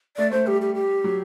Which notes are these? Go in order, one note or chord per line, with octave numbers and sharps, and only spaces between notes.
A3 D5
A3 C5
G3 G4
G4
G4
F#3